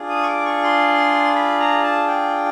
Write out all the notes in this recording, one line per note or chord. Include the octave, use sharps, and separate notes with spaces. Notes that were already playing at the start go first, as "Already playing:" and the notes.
Already playing: D4 F4 G#4
D#6
C#6
D6
C#6
C6
B5
A#5
A5
G5